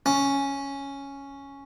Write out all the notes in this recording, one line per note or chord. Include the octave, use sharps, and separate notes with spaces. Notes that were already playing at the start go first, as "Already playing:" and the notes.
C#4